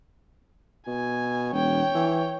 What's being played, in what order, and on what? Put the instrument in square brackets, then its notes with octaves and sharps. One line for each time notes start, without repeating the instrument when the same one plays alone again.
[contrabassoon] B2 [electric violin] G#5
[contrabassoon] E1 [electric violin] C#5 G5
[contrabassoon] E3